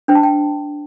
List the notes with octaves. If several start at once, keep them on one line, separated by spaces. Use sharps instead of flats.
D4 C5 G5
A5
G5